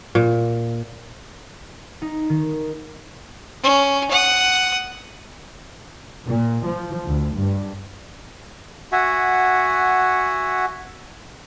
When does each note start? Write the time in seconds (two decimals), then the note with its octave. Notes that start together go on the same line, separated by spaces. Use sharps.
0.15 A#2
2.02 D#4
2.29 D#3
3.63 C#4
4.11 F#5 D#6
6.27 A#2
6.65 F3
7.07 D2
7.35 G2
8.92 F#4 E5 F#5 G#5